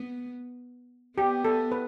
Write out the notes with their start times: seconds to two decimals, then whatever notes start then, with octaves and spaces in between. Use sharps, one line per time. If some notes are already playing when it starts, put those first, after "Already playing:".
Already playing: B3
1.17 B3 G4
1.45 A4
1.72 B4